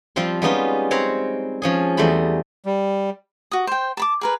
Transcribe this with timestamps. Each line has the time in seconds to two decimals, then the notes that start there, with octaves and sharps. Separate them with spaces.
0.16 F3 G3 C4 F5 C6
0.42 G3 G#3 B3 C#4 D#4 F4
0.91 C4 C5 C#5 F5 A#5 B5
1.62 F3 C#4 G#4
1.97 E2 G3 A3 C5 B5
2.66 G3
3.51 F#4 D#6
3.67 C5 G5
3.97 A5 B5 D6
4.21 G#4 A#4 B4